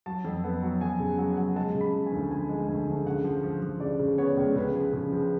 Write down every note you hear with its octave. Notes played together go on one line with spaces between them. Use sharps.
F#3 A5
F2
B3
F#3
F2 G#5
C#3
F#3
F#3
G#3 A5
C#3
B5
F3
G#5
D2
F3 G#5
G#3
D2 G#5
D2
C#3 F#5
F3
F3
F3
C#3 D5
C#3
B3 C#5
C#2
C#3 B4
F3
C#3
F3